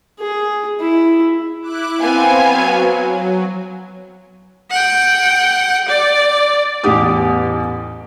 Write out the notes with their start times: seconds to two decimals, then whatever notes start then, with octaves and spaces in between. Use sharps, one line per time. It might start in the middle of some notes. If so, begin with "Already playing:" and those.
0.20 G#4
0.80 E4
1.61 E4 D6 F#6
2.01 B3 C4 F5 G#5
2.46 F#3
4.71 F#5 G5
5.88 D5
6.84 A1 E2 G4 D6 D#6